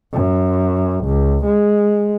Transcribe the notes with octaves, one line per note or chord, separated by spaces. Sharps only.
F#2
C#2
G#3